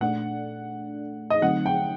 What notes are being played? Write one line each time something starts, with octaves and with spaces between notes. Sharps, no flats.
A#2 A3 D4 A4 D5 F#5
D#5
D3 F#3 A3 C4 D#4 F#5
G5